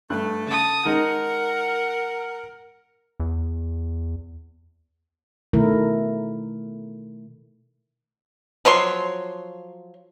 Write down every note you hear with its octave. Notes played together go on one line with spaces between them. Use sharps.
G2 A3 F#6
C#3 A5 D#6
D#3 G#3 D#4 A#4 F#5
E2
B2 D#3 A3 E4 A#4
F3 F#3 C#5 C6